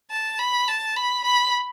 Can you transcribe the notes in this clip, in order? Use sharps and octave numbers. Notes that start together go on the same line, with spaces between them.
A5
B5
A5
B5
B5